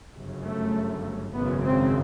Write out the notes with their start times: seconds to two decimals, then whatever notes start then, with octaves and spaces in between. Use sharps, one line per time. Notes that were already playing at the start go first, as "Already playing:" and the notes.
0.13 G1 F#2 C#3
0.43 A3
1.34 G#1 F#2 C#3 B3
1.64 C4